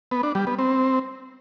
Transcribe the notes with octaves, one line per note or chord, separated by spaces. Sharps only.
B3
D4
G3
B3
C4